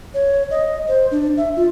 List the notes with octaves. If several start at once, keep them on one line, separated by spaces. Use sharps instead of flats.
C#5
D#5
C5
D4
E5
F4